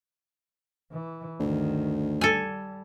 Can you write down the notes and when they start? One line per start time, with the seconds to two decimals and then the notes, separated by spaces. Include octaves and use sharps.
0.92 E3
1.40 D2 G2 D#3
2.21 G3 A4 G#5